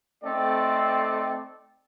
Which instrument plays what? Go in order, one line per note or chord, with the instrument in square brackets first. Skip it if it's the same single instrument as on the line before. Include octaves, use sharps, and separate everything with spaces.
[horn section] A3 C4 D#4 A4 D5 G5